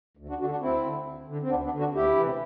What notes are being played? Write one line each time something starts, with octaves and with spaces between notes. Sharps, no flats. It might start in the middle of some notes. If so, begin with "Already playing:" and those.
D2
D4 F#4
D3 D4 F#4
D4 F#4
D2 C4 E4
D3
D2
D3
C4
D2 B3 D4
B3 D4
D3
D4 F#4
D2 E4 G4
C3 E3